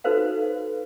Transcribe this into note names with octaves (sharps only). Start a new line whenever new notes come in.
D#4 F#4 A4 B4 C5 F5